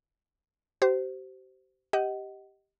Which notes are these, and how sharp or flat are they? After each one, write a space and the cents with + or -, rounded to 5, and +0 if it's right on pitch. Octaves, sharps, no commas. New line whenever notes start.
G4 -40 C5 -15
G4 +0 D#5 +10 F#5 +30